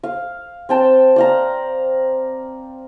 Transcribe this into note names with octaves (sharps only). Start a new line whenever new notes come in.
F5
C4 G5 A5
D5 F5 A#5